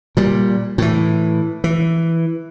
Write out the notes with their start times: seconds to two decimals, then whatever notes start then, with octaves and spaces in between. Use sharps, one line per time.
0.17 A#2 G3
0.78 A2 E3
1.64 E3